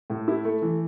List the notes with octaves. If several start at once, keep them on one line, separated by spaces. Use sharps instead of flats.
A2
E4
A3
E3